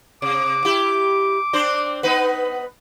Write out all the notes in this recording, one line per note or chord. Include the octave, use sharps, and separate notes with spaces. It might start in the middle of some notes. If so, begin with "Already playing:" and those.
C3 D6
E4 G4
C4 D4 C5
B3 D#4 B4